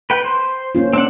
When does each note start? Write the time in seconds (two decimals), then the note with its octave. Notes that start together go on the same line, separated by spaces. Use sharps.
0.10 B4 G5
0.24 C5
0.75 A#3 C#4 F4
0.93 C4 D4 F#5